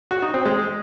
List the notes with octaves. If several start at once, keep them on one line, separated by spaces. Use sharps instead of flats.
F#4
D#4
C4
G#3